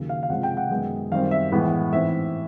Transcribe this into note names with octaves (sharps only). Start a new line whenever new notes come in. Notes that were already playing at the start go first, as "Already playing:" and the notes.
Already playing: D#2 C#3 F#3 A#3
F5
F5
C3 F3 G#3 C#4 F#5
G5
F#5
F#2 D#3 G#3 B3
F#2 D#3 G3 C4 F5
E5
A2 E3 G#3 B3
G#2 E3 A3 C4 E5